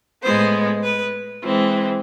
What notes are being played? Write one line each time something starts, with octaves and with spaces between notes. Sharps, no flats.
A2 G#3 B3 C5
B4
E3 G#3 C4 F4